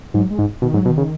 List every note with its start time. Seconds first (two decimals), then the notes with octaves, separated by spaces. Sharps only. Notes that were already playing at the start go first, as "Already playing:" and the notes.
0.14 G#2 F#3
0.30 G#3
0.39 G#2
0.62 B2 D#3
0.74 G#2 F#3
0.86 B2
0.89 D#3
0.98 C#3